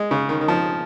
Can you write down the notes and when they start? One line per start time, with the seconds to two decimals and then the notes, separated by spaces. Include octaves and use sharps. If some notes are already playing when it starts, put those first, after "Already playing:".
Already playing: G#3
0.11 C#3
0.29 D#3
0.41 D#3
0.48 F3